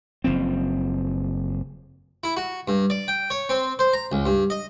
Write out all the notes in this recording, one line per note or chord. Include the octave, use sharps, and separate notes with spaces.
F#1 F3 C4
E4
F#4
G2
D5
G5
C#5
C4
C5
A#5
C#2
G2
D#5